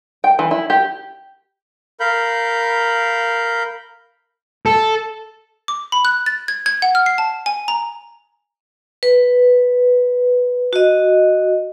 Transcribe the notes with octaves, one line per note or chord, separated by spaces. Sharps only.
G5
E3
E4
G4
A#4 F5 B5 G6
A4
D6
B5
F#6
A6
G#6
G#6
F#5
F6
C7
A5
G#5
A#5
B4
F#4 D#5